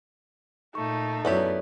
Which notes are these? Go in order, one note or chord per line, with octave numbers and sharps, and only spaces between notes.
A#2 A3 D#4 C#6
F#2 F#3 B3 E4 G4 A4 C#5 D5